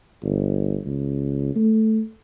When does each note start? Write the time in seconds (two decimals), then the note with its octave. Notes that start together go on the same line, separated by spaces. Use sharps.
0.23 G1
0.86 C#2
1.55 A3